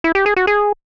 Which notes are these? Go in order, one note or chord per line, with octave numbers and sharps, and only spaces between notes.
E4
G4
G#4
F#4
G#4